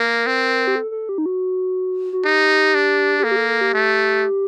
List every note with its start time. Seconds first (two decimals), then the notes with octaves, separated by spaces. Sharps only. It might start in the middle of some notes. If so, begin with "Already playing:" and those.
Already playing: A#3 A#4
0.26 C4
0.67 G4
0.76 A4
0.91 A4
1.09 G4
1.18 D#4
1.26 F#4
2.13 F#4
2.24 D#4 G4
2.75 D4
3.19 G4
3.24 A#3 A4
3.31 G4
3.36 A4
3.49 A4
3.61 G4
3.74 A3